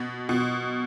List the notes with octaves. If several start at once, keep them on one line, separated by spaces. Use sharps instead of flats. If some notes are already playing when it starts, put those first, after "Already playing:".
Already playing: B2
B2